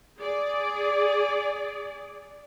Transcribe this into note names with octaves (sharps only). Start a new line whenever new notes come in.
G#4 D5